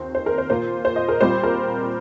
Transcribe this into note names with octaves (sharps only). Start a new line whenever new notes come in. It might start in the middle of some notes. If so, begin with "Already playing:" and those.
Already playing: D#2 D#3 C4 F4 C5
C5
A#4
C5
A#2 A#3 F4 C5
C5
D#5
A#4
A#2 G3 C4 F4 C5
A#4